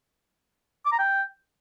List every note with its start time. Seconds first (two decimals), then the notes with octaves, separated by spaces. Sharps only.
0.86 D6
0.92 A#5
0.99 G5